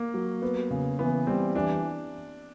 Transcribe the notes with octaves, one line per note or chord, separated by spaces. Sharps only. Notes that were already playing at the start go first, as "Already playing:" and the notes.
Already playing: A#3
F#3
B3
C#3
E3 B3
G3 C4
E3 D4